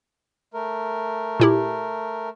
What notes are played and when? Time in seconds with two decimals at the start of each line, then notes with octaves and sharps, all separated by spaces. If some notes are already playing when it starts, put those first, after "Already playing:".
0.54 A3 A#4
1.40 A#2 E4 G4